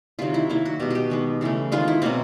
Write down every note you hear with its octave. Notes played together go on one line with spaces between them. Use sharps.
C3 D#3 F#3 F4
E4
D#3 F#3 A#3 E4
F#4
B2 G#3 B3 G4
F#4 G4
D#3 G#3 B3
C#3 E3 A3
D#3 G#3 B3 F4
E4
B2 F#3 A#3 C4